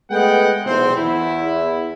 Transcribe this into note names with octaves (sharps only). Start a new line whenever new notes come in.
G#3 A3 B3 F#5 G5
B1 E2 C3 C4 C5
E2 E4